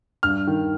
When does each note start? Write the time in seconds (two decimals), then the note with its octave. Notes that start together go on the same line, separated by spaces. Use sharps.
0.23 G2 F6
0.47 D#3